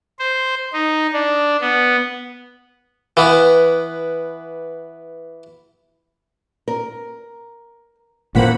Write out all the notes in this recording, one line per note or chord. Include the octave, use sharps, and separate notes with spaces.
C5
D#4
D4
B3
E3 B3
A#4
A1 F2 A#2 A#3 C4 F#5 B5